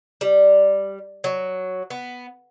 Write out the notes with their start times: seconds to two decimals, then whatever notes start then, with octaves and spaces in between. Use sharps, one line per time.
0.21 G3
1.24 F#3
1.90 B3